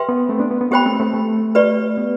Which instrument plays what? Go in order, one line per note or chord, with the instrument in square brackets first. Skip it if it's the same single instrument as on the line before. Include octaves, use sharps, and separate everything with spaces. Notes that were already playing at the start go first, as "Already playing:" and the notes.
Already playing: [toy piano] G4 B4 E5 G5 C6
[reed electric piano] B3
A3 C4
B3 D4
B3
B3
[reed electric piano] B3 [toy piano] G4 C5 G5 B5
[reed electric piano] A3 C4
A3 C4
A3
[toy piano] G4 B4 D5
[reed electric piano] B3